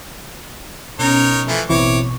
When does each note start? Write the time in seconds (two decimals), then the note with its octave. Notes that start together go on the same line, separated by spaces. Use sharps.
0.99 B2 C#4 D#4 A#4 C#5
1.48 E3 F3 A3
1.70 A1 B2 E3 C4 E4 C#5 C#6 D6